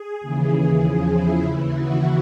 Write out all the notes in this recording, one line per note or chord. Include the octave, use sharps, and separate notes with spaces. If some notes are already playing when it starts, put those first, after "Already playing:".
Already playing: G#4
D#2 C#3 E3
G#4
E2 C#3 F3
E4
D#2 C#3 E3
F#4